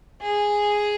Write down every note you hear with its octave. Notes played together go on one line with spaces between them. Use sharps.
G#4